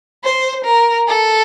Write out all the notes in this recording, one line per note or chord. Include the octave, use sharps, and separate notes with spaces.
C5
A#4
A4